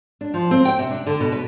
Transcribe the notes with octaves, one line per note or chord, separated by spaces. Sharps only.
D4
F3
C4
G5
C3
D4
D3
B2
B4